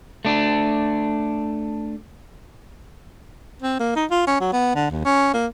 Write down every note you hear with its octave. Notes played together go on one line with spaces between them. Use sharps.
A3 D4
C4
A#3
D#4
F4
C#4
F#3
B3
D3
D#2
C#4
A#3